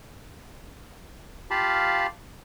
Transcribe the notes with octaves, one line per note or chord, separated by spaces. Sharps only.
F4 G4 F5 A5 B5